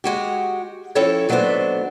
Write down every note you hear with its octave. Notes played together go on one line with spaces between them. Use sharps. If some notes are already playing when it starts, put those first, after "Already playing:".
G#3 F#4 G4
F3 C4 C#4 E4 A4 C#5
D#2 F#3 A3 B3 D4 C5